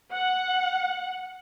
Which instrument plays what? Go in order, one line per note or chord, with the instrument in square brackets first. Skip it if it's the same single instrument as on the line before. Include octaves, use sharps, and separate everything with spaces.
[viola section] F#5